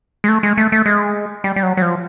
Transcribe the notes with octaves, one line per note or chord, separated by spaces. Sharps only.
G#3
A3
G#3
A3
A3
G#3
G3
G3
F#3
F#3
F3